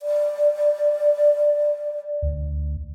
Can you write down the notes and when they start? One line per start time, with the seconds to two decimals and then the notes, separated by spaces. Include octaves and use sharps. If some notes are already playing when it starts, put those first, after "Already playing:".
0.01 D5
2.23 D2